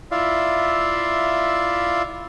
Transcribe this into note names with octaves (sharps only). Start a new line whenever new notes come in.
E4 F4 D5 E5 F5